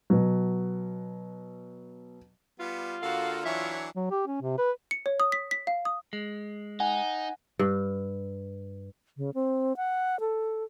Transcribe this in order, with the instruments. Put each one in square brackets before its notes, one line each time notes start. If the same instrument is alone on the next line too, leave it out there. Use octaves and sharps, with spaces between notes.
[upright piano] B2 F#3
[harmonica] G3 B3 [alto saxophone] F4
[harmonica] D3 A#3 A4 [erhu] F#4 [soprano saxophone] F5
[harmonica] E3 F#3 D4 [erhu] C#5 [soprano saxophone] E5
[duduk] F#3
G4
C#4
C3
B4
[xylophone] C#7
C#5
D#6
B6
B6
F5
D#6
[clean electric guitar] G#3
[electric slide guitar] D#4 [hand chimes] F#5 [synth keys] G#5
[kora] G2
[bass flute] C#3
C4
F#5
A4